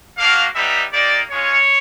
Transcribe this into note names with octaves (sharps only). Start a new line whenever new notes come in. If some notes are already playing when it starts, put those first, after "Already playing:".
A#3 D4 F#4 F5
G3 B3 D#4 G4 E5
A#3 D#4 G4 D5
G#3 C#4 F4 C#5